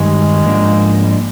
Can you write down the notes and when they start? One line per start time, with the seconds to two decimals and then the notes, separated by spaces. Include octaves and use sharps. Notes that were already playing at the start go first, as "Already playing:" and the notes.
Already playing: G2 D#3 G3 G#3
0.44 G#2 F3 A#3 D4
1.03 G3
1.11 G#3